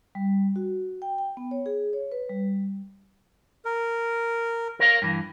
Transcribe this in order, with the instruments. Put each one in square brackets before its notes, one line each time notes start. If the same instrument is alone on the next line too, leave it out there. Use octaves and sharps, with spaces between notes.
[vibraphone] G3
F#4
G5
G5
B3
C#5
G#4
C#5
B4
G3
[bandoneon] A#4
[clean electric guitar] A#4 C#5 F5
G2 E3